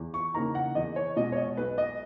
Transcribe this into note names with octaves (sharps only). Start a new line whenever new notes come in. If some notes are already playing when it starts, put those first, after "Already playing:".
Already playing: E2
C#6
C#3 E3 A#3 D#4 A#5
F#5
E2 D#5
C#5
B2 G#3 D#5
C#5
D#5
B1 B4
D#5